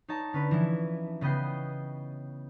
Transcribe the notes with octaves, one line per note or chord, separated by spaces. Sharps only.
D#4 C#5 A5 A#5
D3 C#4 B4
E3 F3 E4
C#3 B3 D#5 G5 C7